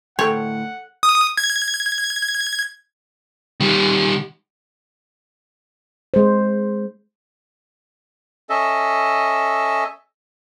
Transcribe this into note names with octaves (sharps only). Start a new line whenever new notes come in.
D2 A2 A4 C#5 F#5 G5 C6
D#6
G#6
D#3 G3
G#3 C5
C#4 A4 D#5 E5